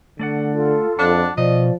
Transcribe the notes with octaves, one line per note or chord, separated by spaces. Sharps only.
D3 A3 D5 F#5
F4 A4
F2 D4 F#5 A5
B2 F3 D5 D#5